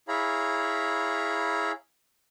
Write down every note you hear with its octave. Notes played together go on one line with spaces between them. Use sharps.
E4 G#4 C#5 F5 A#5 B5